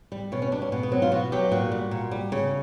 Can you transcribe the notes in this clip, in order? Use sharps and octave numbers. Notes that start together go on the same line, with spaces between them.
G3
B2 C#4
C#4
G3 D4
C#4
B2 B3
B3
F#3 C4
F4
B2 F#4
F#3 G4
A#2 F#4
G3
A#2
G3
C#3